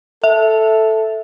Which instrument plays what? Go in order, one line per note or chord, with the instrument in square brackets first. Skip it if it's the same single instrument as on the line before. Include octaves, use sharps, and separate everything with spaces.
[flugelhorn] A4 [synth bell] E5